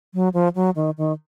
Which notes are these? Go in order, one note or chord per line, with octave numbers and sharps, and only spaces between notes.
F#3
F3
F#3
D#3
D#3